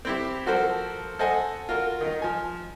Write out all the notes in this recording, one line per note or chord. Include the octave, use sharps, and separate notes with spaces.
C4 E4 G4
F3 F#4 A4 A#4 C5
A4 C5 D#5 F#5 G#5
F4 F#4 A#4
D#3 D#4
F3 G#5